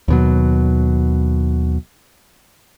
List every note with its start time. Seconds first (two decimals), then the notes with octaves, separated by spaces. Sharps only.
0.08 D#2 B2 F#3